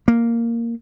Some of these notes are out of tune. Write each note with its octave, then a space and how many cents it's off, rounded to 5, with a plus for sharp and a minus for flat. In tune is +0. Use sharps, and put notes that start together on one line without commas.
A#3 -5